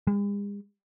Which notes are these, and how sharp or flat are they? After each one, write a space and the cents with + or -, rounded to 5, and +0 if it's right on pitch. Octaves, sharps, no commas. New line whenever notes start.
G#3 -45